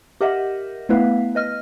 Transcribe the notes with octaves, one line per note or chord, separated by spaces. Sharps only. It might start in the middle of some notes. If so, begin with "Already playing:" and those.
G4 A#4 D#5 E5 F#5
A3 B3 E4 B4 F5
B4 D#5 F6